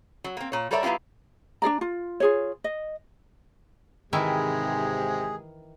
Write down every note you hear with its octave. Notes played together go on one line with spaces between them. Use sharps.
F#3
A#3 C4
A#2 C#5
G3 A4 A#4 C#5 D5 E5
F#3 B3 E4 F4 G4
D4 G#4 D5 A#5
F4
F4 G#4 C#5
D#5
G#2 C3 D#3 E3 G#3 E4 G4 G#4